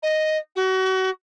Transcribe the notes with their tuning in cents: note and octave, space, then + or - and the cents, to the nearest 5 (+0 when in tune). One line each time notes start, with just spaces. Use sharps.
D#5 +0
F#4 +30